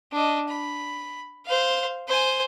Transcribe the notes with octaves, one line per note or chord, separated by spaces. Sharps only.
D4 D#5
B5
C5 F5
C5 G#5